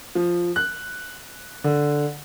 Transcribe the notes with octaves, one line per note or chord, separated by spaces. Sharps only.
F3
F#6
D3